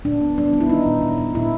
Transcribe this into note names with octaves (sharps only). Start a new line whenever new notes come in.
A#2 D4
B3
G3 D4
B3
E4
G3 D#4
A#2
A#2
A#2
A#2 E4